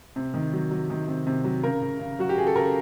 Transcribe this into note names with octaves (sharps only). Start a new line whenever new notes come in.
C3
D#3
F#3
F#3
D#3
C3
C3
F#3
C#3 A#4
C#3
C#3
F#3 F#4
G4
C#3 G#4
A4
C#3 A#4